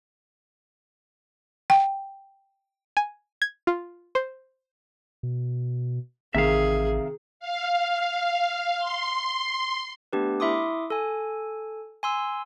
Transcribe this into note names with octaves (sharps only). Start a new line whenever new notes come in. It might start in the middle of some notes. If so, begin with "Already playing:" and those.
G5
G#5
G#6
F4
C5
B2
A1 C3 D#3 G#4 E5 F5
F5
C6
A3 B3 D4 G4 B4
E4 E5 C6 D6 D#6
A4 G#5
G#5 C6 E6